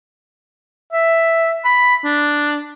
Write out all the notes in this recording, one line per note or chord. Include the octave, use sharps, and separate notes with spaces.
E5
B5
D4